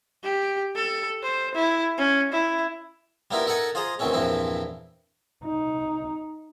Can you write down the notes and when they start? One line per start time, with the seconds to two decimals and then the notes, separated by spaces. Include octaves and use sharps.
0.24 G4
0.76 A4
1.23 C5
1.55 E4
1.98 C#4
2.33 E4
3.31 G3 A#3 B3 E4 F4 A#4
3.46 D#4 A4 A#4 F#5 G#5 A5
3.75 F4 G#4 C5 D#5 A#5
3.99 D2 B2 D#3 E3 C4 C#4
4.13 E2 G2 A#2 F3 C4 E4
5.45 D#4